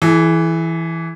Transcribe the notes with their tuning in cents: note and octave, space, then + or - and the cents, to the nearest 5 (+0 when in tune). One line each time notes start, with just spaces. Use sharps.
E3 +0 G#4 +45